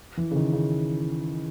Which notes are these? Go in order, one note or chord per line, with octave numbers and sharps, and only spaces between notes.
E3
C#3
D#3
C#3